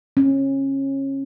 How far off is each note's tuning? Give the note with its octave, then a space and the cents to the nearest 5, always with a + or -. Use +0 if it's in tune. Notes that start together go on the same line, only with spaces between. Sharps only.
C#4 -25